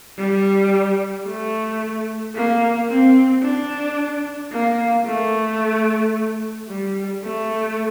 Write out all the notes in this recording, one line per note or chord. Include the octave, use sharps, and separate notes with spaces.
G3
A3
A#3
C4
D4
A#3
A3
G3
A3